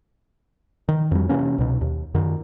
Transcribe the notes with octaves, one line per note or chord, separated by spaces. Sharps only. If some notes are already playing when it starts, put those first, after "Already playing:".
D#3
F2 G3
C3 E3 A#3 C#4
C2 B2
D#2
F#2 D#3